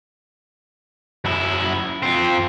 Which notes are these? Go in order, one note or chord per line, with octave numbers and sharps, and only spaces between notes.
F#2 E4
F2 C4